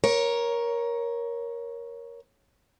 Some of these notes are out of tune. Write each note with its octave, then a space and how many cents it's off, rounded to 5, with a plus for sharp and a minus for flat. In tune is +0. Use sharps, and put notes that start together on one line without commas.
A#4 +15 C#5 +0